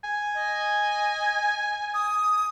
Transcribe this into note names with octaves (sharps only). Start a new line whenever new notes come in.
G#5
D#5
D#6